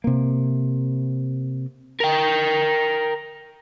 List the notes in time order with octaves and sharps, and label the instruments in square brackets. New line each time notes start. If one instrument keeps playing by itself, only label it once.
[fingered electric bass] C3 A#3
[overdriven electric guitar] A#4 G5